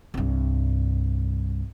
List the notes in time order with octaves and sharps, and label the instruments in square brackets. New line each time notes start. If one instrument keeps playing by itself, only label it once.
[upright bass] C2 G2